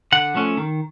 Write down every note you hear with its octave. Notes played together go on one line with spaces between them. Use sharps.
D3 F#5
F3 A3 C#4
D#3